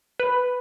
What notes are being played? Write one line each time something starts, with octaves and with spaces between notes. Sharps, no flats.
B4